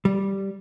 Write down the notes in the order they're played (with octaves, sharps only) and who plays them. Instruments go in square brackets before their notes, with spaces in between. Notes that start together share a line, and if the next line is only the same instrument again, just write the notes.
[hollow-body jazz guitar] G3